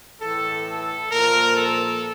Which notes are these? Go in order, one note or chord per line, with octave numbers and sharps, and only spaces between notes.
A2 E3 A4
A4
A#2 F3 A#4
A4